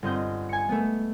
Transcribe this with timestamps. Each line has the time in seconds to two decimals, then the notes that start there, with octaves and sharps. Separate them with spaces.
0.03 G1 C4 D#5 G6
0.49 G#5 C#7
0.69 A3 B3